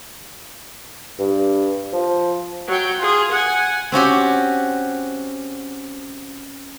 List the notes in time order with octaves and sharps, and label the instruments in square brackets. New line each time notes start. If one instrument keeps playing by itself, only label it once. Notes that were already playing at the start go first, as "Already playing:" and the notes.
[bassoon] G2
F3
[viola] F#3 G5
F4 G#4
F#5 G#5
[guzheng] C4 C#4 F#4 G4